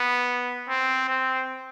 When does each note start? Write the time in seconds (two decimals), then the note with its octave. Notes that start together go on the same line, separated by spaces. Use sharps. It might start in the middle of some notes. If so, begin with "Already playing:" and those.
Already playing: B3
0.69 C4
1.09 C4